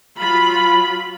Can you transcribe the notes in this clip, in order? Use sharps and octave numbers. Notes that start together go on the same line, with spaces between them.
F#3 F4 B5